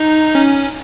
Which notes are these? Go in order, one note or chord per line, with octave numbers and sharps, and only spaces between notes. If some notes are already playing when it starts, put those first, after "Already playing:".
Already playing: D#4
C#4